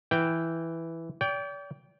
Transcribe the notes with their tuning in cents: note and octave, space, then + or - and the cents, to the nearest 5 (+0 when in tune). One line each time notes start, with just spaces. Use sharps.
E3 +0 G5 +0
D5 -40 G5 +0